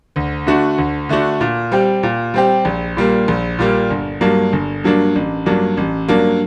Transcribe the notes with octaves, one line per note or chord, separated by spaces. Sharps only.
D2
D3 A3 D4 F#4
D2
D3 A3 D4 F#4
A#2
G3 C4 G4
A#2
G3 C4 G4
A#1
A#2 G3 A#3
A#1
A#2 G3 A#3
G1
G2 F#3 A#3 D4
G1
G2 F#3 A#3 D4
A1
G2 F#3 A#3 D4
A1
G2 F#3 A#3 D4